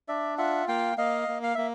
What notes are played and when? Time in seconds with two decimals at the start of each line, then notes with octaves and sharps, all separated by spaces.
0.08 D4 D5 E5
0.38 F4 E5 F#5
0.68 A#3 F5 G5
0.98 A#3 D#5 F5
1.28 A#3
1.43 F5
1.55 A#3 E5